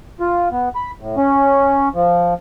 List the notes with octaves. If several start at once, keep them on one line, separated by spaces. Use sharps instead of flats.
F4
B3
B5
A2
C#4
F3